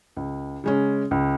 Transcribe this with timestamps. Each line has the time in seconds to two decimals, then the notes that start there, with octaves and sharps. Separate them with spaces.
0.17 C#2
0.64 C#3 G#3 C#4
1.11 C#2